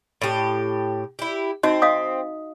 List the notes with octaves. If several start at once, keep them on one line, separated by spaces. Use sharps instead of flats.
A2 G4
E4 G4
C4 D#4 F#4 D#5
D#5 F5 D#6